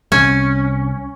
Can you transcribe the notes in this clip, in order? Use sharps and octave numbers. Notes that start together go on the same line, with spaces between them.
C2 C#4